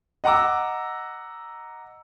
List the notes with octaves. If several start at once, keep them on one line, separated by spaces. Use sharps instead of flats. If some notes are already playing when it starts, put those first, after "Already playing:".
D#5 F#5 A#5 D6 E6